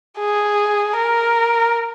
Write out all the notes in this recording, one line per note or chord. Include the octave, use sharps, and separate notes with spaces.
G#4
A#4